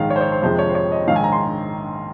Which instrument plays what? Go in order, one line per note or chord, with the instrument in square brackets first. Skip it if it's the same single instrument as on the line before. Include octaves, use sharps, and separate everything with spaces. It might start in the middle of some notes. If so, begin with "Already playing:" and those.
Already playing: [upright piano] A#1 G#2 D#3 G#3 F5
C#5
C5
C#5
C5
F2 C3 F3 G#3 C5
C#5
C5
C#5
D#5
A#1 G#2 D#3 F5
G#5
A#5
C6